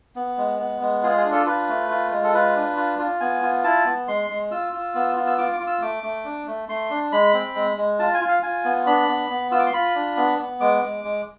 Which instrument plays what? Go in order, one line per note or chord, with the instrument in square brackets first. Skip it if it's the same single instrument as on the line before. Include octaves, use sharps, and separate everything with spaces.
[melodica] B3
G#3
B3
G#3
F4 G#4
G#4
D4
A4
F4 B4
A3
F4
G#3
A4
F4 B4
D4
F4
F4
B3 G#5
F4
E4 A5
B3
G#3 C6
G#3
F4 E6
F4
B3
F4
E6
F4 D6
D6
F4
E6
A3 D6
A3
D4
A3
A3 C6
D4
G#3 B5
C4
G#3
G#3
F4 A5
G#5
F4
F5
F4 G#5
B3
D4 B5
B3
B3
F4 E6
D6
C6
F4 B5
D4
B3
B3
G#3 D6
G#3
G#3